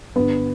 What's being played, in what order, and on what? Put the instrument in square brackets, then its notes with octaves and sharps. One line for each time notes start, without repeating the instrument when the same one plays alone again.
[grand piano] G2 D3 B3